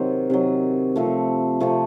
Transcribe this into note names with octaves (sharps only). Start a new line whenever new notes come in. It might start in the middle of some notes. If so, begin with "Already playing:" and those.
Already playing: C3 D#3 F#3 C5
C3 D#3 F#3
C3 F3 A3
C3 F3 A3